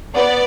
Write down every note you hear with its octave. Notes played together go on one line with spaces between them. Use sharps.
B3 D5